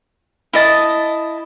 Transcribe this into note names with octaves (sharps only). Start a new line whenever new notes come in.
E4 D#5 A5